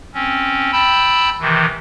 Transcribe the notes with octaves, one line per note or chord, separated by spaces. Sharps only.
C4 C#4
G5 A5 B5 E6 G6
C3 D#3 E3